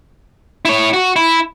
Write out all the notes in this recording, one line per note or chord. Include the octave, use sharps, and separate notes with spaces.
E4 C#5
F#4
E4